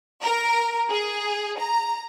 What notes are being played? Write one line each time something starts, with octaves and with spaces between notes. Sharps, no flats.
A#4
G#4
A#5